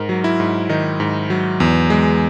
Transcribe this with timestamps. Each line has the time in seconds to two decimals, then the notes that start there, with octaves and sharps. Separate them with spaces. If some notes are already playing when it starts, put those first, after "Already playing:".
Already playing: G#2 A#4
0.09 F#3
0.24 E4
0.40 G#2
0.69 D#3 D#4
1.00 G#2
1.30 F#3
1.60 E2
1.90 G#3